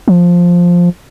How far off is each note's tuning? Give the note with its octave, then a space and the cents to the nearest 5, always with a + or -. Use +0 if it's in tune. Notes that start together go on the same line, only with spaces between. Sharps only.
F3 +5